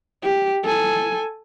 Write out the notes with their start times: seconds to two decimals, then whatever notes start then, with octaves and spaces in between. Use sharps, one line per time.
0.22 G4
0.63 A4 G#5